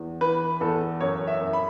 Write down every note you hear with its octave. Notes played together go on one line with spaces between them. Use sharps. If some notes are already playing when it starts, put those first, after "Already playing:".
Already playing: E2
E3 B4
E2 A4
F#2 C#5
E5
F#2
B5